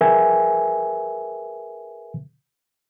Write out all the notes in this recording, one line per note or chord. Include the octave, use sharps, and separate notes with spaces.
G#4 A#4 B4 E5 G5 G#5